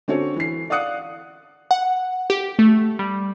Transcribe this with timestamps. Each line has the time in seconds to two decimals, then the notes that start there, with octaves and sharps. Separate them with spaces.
0.08 D3 C4 C#4 F#4 A4 C#5
0.36 E3 C7
0.70 D5 F5 F#5 D#6 F#6 C#7
1.71 F#5
2.30 G4
2.59 A3
2.99 G3